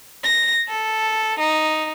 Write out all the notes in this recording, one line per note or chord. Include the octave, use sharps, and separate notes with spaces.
A#6
A4
D#4